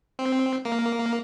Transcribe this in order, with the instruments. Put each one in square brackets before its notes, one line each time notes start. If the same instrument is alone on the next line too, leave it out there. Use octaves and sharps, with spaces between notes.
[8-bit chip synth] C4
A#3